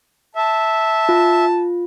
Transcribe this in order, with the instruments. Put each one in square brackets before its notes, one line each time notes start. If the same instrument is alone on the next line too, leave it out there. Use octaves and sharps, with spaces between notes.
[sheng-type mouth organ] E5 [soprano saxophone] A5
[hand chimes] F4